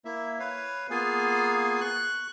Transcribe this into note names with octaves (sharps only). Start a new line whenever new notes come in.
A#3 E4 E5
B4 C#5 F5
A#3 B3 F4 G#4 F5 G#5
C#6 F#6